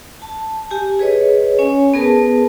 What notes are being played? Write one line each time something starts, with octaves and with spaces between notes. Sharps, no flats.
A5
G4 G#5
G#4 B4 C#5 D#5
C#4 C#5 G#5
B3 G#4 A#4 B4 A5